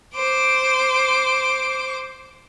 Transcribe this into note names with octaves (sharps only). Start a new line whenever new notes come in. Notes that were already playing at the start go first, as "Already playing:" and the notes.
C5 D6